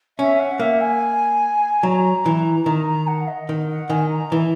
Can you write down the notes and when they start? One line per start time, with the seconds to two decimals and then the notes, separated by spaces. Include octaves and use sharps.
0.19 C#4 E5
0.40 F#5
0.60 A#3 E5
0.81 G#5
1.83 F#3 A#5
2.26 E3
2.66 D#3 A#5
2.87 A#5
3.07 F#5
3.28 D#5
3.49 D#3
3.69 F#5
3.90 D#3 G#5
4.10 A#5
4.32 E3